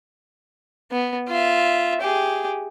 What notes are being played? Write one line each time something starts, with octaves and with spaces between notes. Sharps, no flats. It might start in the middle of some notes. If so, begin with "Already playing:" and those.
B3
F4 E5
G4 G#4